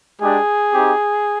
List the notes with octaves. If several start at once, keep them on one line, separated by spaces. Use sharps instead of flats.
G#3 D4 G4 G#4
C4 D#4 G4